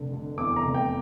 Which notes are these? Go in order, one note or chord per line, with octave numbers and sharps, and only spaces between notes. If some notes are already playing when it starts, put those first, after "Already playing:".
Already playing: F1 D3
D3
E2 D6
A#5
F1
G5